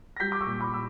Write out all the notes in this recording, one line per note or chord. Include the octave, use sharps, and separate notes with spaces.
A#6
G3 G6 B6
D6
C#6 E6
A#2
B5 D6
E6